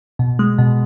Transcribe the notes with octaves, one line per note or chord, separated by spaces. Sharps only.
B2
G#3
B2